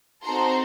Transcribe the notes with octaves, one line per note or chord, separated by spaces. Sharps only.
C4 D#4 F#4 A4 A#5 C6